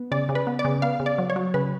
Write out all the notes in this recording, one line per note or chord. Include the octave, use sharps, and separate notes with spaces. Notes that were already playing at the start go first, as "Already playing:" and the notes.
Already playing: B3
C#3 D5
C#3
B4
B3
D5
C#3
B3 F5
C#3
D5
F#3
C#5
F#3
C#3 B4